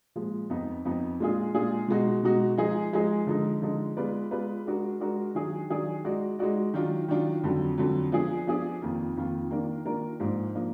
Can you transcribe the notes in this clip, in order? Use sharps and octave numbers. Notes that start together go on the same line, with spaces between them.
A#2 F3 G#3
F2 F3 B3 D#4
F2 F3 B3 D#4
A#2 G#3 D4 F4 G#4
A#2 G#3 D4 F4 G#4
B2 G#3 D#4 F#4
B2 G#3 D#4 F#4
F3 G#3 D#4 G#4
F3 G#3 D#4 G#4
D3 F3 G#3 D#4
D3 F3 G#3 D#4
G#3 B3 F4 B4 D5
G#3 B3 F4 B4 D5
G#3 D4 F#4 A#4
G#3 D4 F#4 A#4
D#3 F#3 D4 G#4 D5
D#3 F#3 D4 G#4 D5
G#3 D#4 F#4 D5
G#3 D#4 F#4 D5
D#3 F#3 D4 F4
D#3 F#3 D4 F4
F2 D3 F#3
F2 D3 F#3
F3 B3 D4 G#4 D5
F3 B3 D4 G#4 D5
F2 D#3 A#3 F4
F2 D#3 A#3 F4
D#3 A#3 D4 F4 A#4
D#3 A#3 D4 F4 A#4
G#2 F3 A#3 D4
F3 A#3 D4